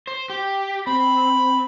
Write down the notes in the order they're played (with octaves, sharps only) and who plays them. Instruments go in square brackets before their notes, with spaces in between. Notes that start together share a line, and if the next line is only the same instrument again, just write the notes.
[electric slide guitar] C5
G4
[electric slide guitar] C4 [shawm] B5